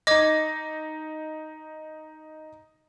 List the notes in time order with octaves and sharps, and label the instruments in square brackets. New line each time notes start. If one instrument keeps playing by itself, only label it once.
[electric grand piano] D#4 A#6 [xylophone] D#5 D6 G#6